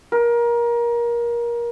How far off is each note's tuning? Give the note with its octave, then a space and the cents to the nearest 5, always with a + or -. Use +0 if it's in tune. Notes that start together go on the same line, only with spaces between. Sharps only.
A#4 +25